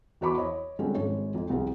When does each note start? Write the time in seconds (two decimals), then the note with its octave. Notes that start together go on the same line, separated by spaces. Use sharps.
0.21 E2 F#4 C5 B5 C#6 D6
0.38 C#5 D#5
0.79 D3 F3 G3 G#3 C4 C#4
0.95 G#1 G#3 C#5
1.34 F2 F3
1.50 C2 C4 G#4